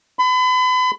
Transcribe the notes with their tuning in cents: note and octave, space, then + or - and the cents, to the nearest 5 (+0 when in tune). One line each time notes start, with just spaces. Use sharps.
B5 +35